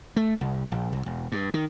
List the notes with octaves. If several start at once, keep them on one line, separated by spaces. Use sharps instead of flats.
A3
C2
A#1
C2
E1
G2
D#3